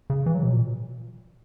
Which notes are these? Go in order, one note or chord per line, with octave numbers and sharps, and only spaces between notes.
C#3
E3
F#3
B2
A#2